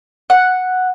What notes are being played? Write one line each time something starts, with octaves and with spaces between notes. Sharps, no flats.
F#5